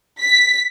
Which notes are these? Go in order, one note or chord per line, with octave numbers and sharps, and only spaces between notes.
B6